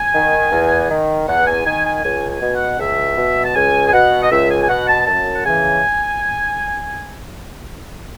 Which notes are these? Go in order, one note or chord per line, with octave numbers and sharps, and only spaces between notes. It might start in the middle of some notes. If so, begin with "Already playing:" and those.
Already playing: G#5
D#3
E2
D#3
E2 F#5
G#5
D#3 G#5
G#5
C#2 G#5
G#5
B2
F#5
C#2 E5
B2
A5
C#2 G#5
G#5
B2 F#5
D#5
C#2 E5
G#5
G#5
B2 F#5
A5
F#2 A5
F#5
C#3 E3 G#5